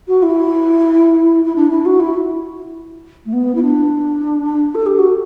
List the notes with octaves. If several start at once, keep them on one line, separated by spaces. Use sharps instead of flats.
F#4
E4
E4
D4
E4
F#4
E4
A3
B3
E4
D4
A4
G4
F#4